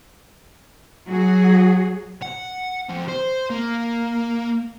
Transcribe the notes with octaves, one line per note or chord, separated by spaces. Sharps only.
F#3 F#4 G#4
F#5
F2
C5
A#3